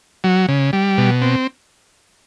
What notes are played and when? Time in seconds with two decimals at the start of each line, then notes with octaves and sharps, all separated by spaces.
0.24 F#3
0.48 C#3
0.73 G3
0.98 B2
1.22 C4